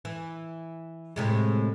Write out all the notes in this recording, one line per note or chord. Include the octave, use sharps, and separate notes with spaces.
E3
A2 C3 G#3